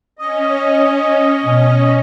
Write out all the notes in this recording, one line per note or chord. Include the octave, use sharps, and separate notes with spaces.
C#4 D#5
B2 C#4